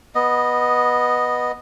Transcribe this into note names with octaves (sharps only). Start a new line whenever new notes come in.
B3 D#5